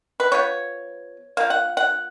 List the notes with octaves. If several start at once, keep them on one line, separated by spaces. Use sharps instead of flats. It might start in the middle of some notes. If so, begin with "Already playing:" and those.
B4
F3 B3 C#5
F3 A#3 F5
F#5
F#5